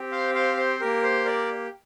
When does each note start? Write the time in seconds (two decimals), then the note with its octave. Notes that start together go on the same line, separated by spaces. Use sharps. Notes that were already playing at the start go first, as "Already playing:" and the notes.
Already playing: C4 G4
0.11 C5 F5
0.34 C5 F5
0.57 C5
0.79 A#3 G4 A#4
1.03 C5
1.25 A#4 D5